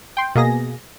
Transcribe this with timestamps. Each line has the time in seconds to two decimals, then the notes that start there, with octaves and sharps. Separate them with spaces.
0.17 G5 C6
0.35 B2 A#3 G#4 A#6